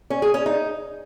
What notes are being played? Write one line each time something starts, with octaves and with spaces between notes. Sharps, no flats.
C#4
G#4
C#4
D#4